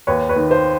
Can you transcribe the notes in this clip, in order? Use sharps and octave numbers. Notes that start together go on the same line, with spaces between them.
D#2 B4 C#5
B4 C#5
D#3
C5